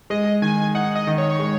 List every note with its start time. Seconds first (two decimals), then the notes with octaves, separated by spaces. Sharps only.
0.10 G#3 D#5
0.42 D#3 G#5
0.75 D#4 F#5
0.95 D#5
1.07 D#3
1.18 C#5
1.39 G#3